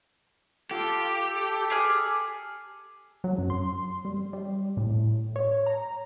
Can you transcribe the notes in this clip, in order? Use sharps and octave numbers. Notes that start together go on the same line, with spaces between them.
F4 G4 A4 F5
A4
G4 G#4 F6
F#3
F#2
C6
G3
G3
A2
C#5
A#5